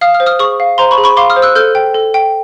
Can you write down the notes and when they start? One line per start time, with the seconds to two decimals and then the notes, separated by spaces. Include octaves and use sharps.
0.01 F5 D#6 F6
0.14 D#6 F6
0.20 C5
0.26 D#6 F6
0.39 G#4 C#6 D#6
0.60 F5
0.78 C5 A#5 C6
0.91 B5 C#6
0.98 G#4
1.04 B5 C#6
1.17 F5 C6 D6
1.30 D#6 F6
1.36 C5
1.42 E6 F#6
1.55 A4 F6 G6
1.75 G5
1.94 A4
2.14 G5